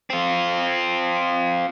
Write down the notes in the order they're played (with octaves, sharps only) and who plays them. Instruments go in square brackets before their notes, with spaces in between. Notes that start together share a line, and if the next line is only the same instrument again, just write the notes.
[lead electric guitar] C4 F4